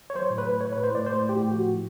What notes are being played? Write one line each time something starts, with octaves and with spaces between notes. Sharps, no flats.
C#5
F#3 C5
A2
B4
A2
A2 C#5
B4
A2
C5
A2 D5
A3 C5
A2
G4
A2
F3 F#4
F3